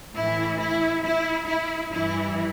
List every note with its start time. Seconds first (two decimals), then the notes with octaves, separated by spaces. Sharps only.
0.15 A2 E3 E4
0.60 E4
1.04 E4
1.48 E4
1.93 G2 E3 E4